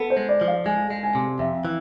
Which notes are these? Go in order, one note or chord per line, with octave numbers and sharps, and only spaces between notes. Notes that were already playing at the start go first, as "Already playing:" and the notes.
Already playing: B3 A4
C5
G#3
D5
F3
F5
G#3 G#5
G#3
G#5
C3
F2 E5
E3